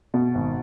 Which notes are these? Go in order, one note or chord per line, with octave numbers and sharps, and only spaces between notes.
B2
G#1